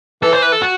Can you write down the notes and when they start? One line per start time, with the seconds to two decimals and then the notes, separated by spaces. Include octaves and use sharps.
0.22 E3 A4
0.33 C5
0.42 B4
0.52 A4
0.62 F#4